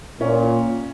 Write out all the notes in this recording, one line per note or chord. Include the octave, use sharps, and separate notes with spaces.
A#2 C#4